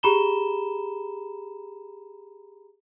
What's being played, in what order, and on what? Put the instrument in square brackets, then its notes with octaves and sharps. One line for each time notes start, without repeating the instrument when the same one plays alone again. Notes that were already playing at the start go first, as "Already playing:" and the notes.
[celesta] G4 G#4 A#5 B5 E7 G7